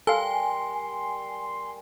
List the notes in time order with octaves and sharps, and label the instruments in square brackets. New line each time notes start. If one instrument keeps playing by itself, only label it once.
[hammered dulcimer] G3 A#4 [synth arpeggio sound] A4 F5 [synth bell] G#5 [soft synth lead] C6